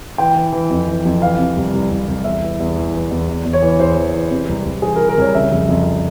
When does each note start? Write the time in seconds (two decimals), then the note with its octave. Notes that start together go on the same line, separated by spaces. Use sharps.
0.18 E3 G5
0.36 E3
0.53 E3
0.70 F2
0.88 E3
1.05 F2
1.21 E3 F5
1.39 C3
1.57 C2
1.73 C2
1.91 C2
2.08 C2
2.24 E2 E5
2.43 E3
2.60 E2
2.76 E3
2.94 E3
3.11 E2
3.28 E2
3.45 E2
3.53 C#5
3.62 E3
3.80 E2 C5
3.97 E3
4.14 E3
4.31 C3
4.49 C2
4.65 C2
4.82 E3 G#4
4.96 A#4
5.01 E3
5.09 A#4
5.17 C2 C#5
5.34 C#3 E5
5.51 F2
5.69 F2